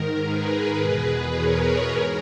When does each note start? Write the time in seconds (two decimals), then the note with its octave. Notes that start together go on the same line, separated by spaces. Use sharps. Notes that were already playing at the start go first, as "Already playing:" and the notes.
Already playing: G#2 D#3 A#4
0.22 G#4 B4
0.77 E2 B2
1.33 A#4 C#5
1.89 G#2 A#4